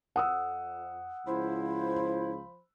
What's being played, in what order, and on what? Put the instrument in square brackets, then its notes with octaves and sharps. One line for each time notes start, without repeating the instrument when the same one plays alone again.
[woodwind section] F2 [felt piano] F#5 D#6 E6
[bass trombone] C#2 [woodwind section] F3 C5 B5 [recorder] E4